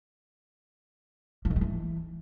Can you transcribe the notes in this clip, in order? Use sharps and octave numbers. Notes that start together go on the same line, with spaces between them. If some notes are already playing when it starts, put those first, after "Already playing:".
F3
G#2
F#3
E3